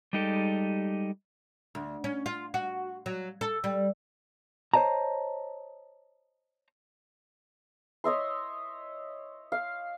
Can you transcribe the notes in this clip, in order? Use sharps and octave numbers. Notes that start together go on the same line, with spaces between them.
G3 G#3 D#4 G4 A4
D2
C#4
F4
F#4
F#3
A4
G3
C5 C#5 D#5 A5 A#5
C#5 D#5 E5 C6
F5